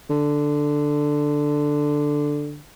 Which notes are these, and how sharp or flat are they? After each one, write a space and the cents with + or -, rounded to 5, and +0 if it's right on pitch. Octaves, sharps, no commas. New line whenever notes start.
D3 +5